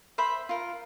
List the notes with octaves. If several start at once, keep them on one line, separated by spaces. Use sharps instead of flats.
C5 E5 B5 C6
F4 A#4